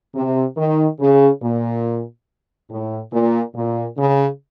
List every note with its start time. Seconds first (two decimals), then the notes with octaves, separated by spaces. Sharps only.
0.15 C3
0.57 D#3
1.00 C#3
1.43 A#2
2.70 A2
3.12 A#2
3.55 A#2
3.97 C#3